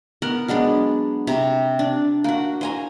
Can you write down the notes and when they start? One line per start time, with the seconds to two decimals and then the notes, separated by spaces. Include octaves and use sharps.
0.22 B3 A#4 F#5
0.48 F#3 G#3 B3 D4
1.27 C3 A#5
1.79 D4
2.24 A#3 F#4
2.61 C5 G#5 A#5